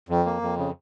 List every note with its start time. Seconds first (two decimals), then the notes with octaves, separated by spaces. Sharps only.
0.09 F2
0.25 A#3
0.42 F2
0.58 C#3